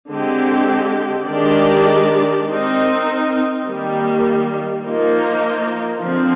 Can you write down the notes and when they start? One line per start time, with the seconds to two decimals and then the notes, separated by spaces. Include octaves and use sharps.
0.10 D3 G#3 C4 G4
1.29 D#3 G#3 D4 G4 D5
2.47 C4 D#4 A#4
3.65 D#3 G3 A#3
4.84 F3 A#3 D#4 A#4
6.03 D3 F3 C4